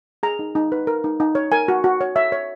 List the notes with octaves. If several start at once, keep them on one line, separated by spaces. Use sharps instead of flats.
G#4 A#5
D#4
D#4
B4
A#4
D#4
D#4
C#5
A#4 G#5
F#4
F#4
C#5
C#5 E5
C#5